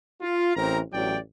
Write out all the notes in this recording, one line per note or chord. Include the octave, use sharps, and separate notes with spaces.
F4
A1 E3 C4 A#4 A#5
A1 E2 F#3 D5 G5